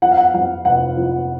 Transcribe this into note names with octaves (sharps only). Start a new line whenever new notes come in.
F3 F#5
F5
F#5
F2 F#5
F1 F#5
F3